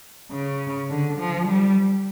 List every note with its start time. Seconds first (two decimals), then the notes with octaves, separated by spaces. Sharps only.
0.31 C#3
0.90 D3
1.18 F3
1.48 G3